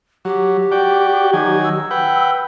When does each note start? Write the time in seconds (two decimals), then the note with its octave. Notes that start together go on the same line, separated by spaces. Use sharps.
0.25 F#3 G4
0.72 F#4 D5 G5
1.33 D#3 F#3 G#5
1.64 E6
1.91 B4 F#5 G5